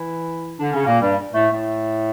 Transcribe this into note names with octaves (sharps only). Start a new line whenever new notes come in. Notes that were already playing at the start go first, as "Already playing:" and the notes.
Already playing: E3 E4
D3 D4
C#3 C#4
A#2 A#3
G2 G3
A2 A3
A2 A3